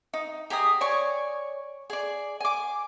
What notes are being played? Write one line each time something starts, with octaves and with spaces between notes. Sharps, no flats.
D#4
G4 G#4 A#5 D#6
C#5 D5 G#5 C#6
G#4 D5
G#5 D6